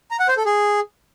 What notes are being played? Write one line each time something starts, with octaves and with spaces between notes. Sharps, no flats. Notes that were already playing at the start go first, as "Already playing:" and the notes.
A#5
F#5
C5
A4
G#4